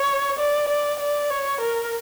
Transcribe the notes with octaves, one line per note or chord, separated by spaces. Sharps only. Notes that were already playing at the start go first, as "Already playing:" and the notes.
Already playing: C#5
D5
D5
D5
C#5
A#4